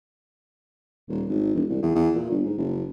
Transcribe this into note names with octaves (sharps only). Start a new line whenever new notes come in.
D#1
G#1
E1
C2
E2
E2
A#2
G1
G#2
F#1